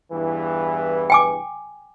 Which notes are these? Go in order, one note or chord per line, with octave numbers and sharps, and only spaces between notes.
E2 G2 E3
G5 G#5 D6